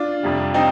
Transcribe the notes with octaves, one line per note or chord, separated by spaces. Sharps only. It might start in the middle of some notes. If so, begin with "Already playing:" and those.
Already playing: D4 F4
F2 C3 G3
C4 D#4